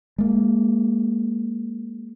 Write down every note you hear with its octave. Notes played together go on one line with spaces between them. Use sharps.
G#3 A#3